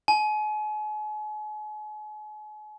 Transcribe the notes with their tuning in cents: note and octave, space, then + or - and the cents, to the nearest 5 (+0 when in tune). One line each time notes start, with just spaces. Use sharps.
G#5 +40